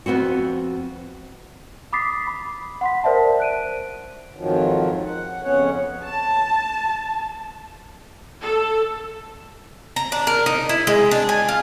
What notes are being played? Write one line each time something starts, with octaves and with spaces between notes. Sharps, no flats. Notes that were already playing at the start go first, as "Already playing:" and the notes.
F2 B3 C4 F#4
B5 D6 D#6 A6 B6 C7
B5
F#5 C6 B6
A#4 C5 D5 E5 A5
F#6 D7 D#7
F2 G#2 D#3 F3 F#3
F#5
F2 C#3 B3 C#4 C#5 F#5
A5
A4
A#5
D4
A#4
D#4
E4
G#3
D4
G#5
F4